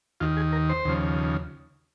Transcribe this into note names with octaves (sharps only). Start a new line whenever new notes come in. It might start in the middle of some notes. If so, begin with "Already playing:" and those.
D#2 D#3 F4
G#4
A#4
C5
D#2 C#3 F3